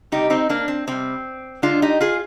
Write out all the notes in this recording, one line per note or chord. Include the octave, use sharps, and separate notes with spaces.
C3 G3 D#4 G4
C4 D#4
A#3 D4
C4
C3 G3 C4
D3 G#3 D4 F4
D#4 G4
F4 G#4